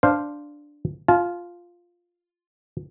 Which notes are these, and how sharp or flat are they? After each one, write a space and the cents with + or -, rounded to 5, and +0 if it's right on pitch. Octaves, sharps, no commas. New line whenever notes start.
D4 +0 C5 +0 F5 +0
F4 +0 A5 -40